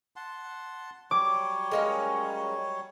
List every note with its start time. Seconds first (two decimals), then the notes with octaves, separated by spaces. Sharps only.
0.16 F#5 A5 C6
1.11 F#3 G3 C#5 D6
1.71 G#3 A#3 C#4